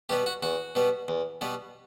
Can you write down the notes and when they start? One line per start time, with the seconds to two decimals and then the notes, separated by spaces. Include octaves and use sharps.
0.09 B2 G3 B3 G4
0.26 F#4
0.43 E2 F#4
0.75 B2 G3 B3
1.08 E2
1.41 B2 G3 B3